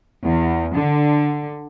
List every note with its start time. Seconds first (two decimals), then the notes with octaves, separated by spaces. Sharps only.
0.22 E2
0.75 D3